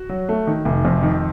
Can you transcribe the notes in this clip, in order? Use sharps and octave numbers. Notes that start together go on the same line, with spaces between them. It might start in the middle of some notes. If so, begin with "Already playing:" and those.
Already playing: F#4
F#3
A3
D#3
F1
F2
D#3